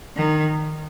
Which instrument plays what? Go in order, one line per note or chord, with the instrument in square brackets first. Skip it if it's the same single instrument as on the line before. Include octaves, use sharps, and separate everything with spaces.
[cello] D#3